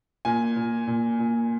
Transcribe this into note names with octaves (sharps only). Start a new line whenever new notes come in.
A#2 G#5
A#2
A#2
A#2